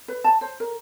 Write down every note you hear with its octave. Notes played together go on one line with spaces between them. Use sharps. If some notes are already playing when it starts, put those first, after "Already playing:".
B4
A5
C5
A#4